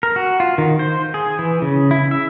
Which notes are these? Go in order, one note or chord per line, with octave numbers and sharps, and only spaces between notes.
A#4
F#4
F4
D#3
C5
G#4
E3
C#3
E4
E5